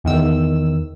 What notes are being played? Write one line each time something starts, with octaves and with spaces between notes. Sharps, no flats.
E2 D#3 E6